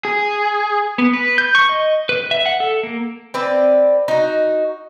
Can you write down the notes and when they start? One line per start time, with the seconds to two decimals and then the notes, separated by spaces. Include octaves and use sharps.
0.05 G#4
0.98 B3
1.13 B4
1.38 G6
1.55 C#6
1.69 D#5
2.09 B4
2.31 E5
2.46 F#5
2.60 A4
2.83 A#3
3.34 C4 B4 D5
4.08 D#4 F#4